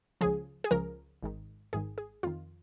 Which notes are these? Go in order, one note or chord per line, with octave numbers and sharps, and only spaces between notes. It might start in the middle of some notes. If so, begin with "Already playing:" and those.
C#2 C#3 F3 G#4
G#4
C#2 C#3 F3 A#4
G#1 G#2 D#3
G#1 G#2 D#3 G#4
G#4
F2 D#3 F4